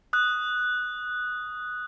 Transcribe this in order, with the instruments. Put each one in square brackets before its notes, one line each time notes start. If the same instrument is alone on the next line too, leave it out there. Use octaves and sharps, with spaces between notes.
[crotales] D#6 F#6